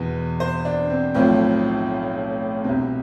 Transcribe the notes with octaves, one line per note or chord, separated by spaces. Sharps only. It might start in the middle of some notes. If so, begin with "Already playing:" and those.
Already playing: E2 B2 B4
C5
D4
C4
B1 A2 F3 C4
C2 B2 C4